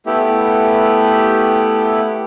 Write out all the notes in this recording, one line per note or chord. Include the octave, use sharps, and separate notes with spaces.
A3 B3 E4 G4